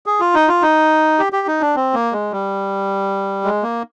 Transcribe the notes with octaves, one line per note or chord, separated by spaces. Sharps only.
G#4
F4
D#4
F4
D#4
G4
G4
D#4
D4
C4
A#3
G#3
G3
G#3
A#3